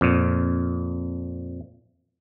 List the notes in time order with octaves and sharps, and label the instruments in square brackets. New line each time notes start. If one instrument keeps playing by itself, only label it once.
[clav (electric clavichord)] F2 A#2